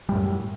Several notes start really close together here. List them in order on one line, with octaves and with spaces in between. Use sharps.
G3 A2 F#2